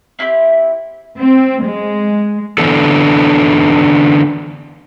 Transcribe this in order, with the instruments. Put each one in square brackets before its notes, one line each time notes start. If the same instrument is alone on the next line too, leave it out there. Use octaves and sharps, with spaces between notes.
[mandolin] C4 E4 F#4 G4
[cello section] C4
G#3
[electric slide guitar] D3 E3 B3 D4 A4